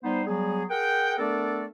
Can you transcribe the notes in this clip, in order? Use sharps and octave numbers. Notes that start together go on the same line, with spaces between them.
G3 B3 D#4 C5
F#3 G3 B3 G#4
G#4 A#4 F#5 G5
A3 B3 D4 A4 A#4 D5